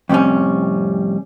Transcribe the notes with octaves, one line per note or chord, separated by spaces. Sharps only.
F2 A2 C3 G3 C#4